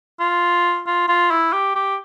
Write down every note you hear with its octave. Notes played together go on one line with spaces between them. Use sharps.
F4
F4
F4
E4
G4
G4